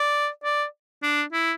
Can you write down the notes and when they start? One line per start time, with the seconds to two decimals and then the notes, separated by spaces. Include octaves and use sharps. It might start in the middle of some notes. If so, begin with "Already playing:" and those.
Already playing: D5
0.44 D5
1.03 D4
1.32 E4